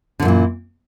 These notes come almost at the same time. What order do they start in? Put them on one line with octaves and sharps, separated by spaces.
D3 F#2 A#2 E3